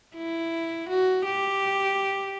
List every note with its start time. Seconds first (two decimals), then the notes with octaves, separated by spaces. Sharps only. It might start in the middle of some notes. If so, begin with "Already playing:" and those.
0.16 E4
0.89 F#4
1.25 G4